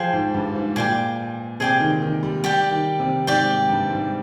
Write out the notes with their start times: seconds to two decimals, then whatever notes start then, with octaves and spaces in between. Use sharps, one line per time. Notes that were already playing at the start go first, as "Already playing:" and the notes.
Already playing: F3 G#4 C5 G5
0.13 G#2
0.34 G2
0.55 G#2
0.76 A#2 G#4 D5 G5 D6
1.60 C3 G#4 D5 G5 D6
1.80 D#3
2.02 D#3
2.23 G3
2.44 G3 G4 D5 G5
2.71 D#3
3.00 C3
3.27 G#2 G4 D5 G5
3.69 G2
3.90 G#2